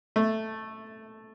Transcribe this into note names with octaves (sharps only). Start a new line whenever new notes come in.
A3